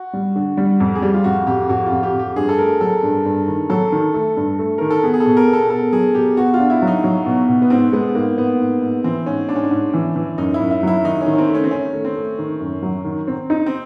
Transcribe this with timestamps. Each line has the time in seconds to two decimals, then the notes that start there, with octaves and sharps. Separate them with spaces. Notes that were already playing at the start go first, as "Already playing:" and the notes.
Already playing: F#4
0.13 G3
0.36 D3
0.57 G3
0.80 F2
0.95 G#4
1.02 G3 G4
1.14 F4
1.24 F2 F#4
1.47 F2 G4
1.69 F2 F#4
1.86 F4
1.92 F2
2.03 G4
2.14 F2
2.19 G4
2.36 G2 G#4
2.49 A4
2.58 A3 A#4
2.81 F#3 A4
3.03 G2
3.25 G2
3.48 D#3
3.70 F#3 A4
3.92 D#3
4.14 A3
4.36 G2
4.59 A3
4.78 D#3 A#4
4.90 A4
5.03 B3 G#4
5.14 G#4
5.20 A4
5.26 B2
5.37 A#4
5.48 B3
5.53 A4
5.70 B3 A4
5.92 F#3 G#4
6.15 B2 G4
6.37 B3 F#4
6.54 F4
6.59 D4
6.70 E4
6.82 F#3
6.87 D#4
7.04 F#3
7.26 B2
7.48 B2
7.62 B3
7.70 G#2 C4
7.93 G#3 B3
8.15 G#2 A#3
8.37 G#2 B3
8.60 G#2
8.82 G#2
9.04 E3 C4
9.26 G#2 C#4
9.49 G#2 D4
9.56 C#4
9.64 D4
9.71 G#2
9.94 E3
10.16 E3
10.38 F#2 D#4
10.54 E4
10.60 F#2
10.71 E4
10.83 F#3 E4
11.05 D#3 D#4
11.21 C#4
11.26 D#3
11.34 C#4
11.38 C4
11.49 A3
11.55 C#4
11.64 C4
11.71 D#3 C#4
11.93 A3
12.05 C4
12.16 A3
12.38 D#3
12.61 F#2
12.83 F#3
13.05 D#3
13.27 C4
13.50 D#4
13.66 C4